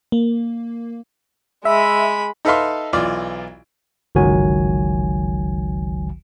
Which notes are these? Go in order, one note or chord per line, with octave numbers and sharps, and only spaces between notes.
A#3
G#3 E5 B5
D#4 A4 B4 E5 F5 C6
B1 E3 F4 D5
G1 C#2 D#3 F#3 F#4 G#5